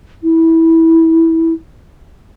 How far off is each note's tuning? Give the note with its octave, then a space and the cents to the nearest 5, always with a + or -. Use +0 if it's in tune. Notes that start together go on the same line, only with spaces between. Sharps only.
E4 -15